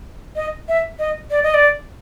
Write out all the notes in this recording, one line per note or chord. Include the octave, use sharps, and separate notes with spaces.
D#5
E5
D#5
D5
D#5
D5